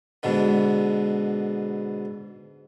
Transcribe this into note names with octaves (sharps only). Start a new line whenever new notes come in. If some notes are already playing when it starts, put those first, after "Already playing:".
G#2 B2 D3 B3